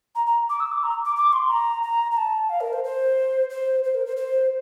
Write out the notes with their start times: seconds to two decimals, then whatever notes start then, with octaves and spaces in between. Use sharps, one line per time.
0.15 A#5
0.27 A#5
0.50 D6
0.60 E6
0.72 D6
0.83 A#5
1.05 D6
1.16 D6
1.33 C6
1.49 A#5
1.83 A#5
2.11 A#5
2.17 A5
2.50 F5
2.61 A#4
2.73 C5
2.84 C5
3.50 C5
3.84 C5
3.95 A#4
4.06 C5
4.17 C5